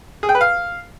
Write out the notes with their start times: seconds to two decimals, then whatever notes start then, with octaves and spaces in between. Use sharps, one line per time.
0.23 G#4
0.29 G5
0.35 B4
0.41 F5